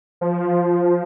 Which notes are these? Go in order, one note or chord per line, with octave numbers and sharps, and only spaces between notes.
F3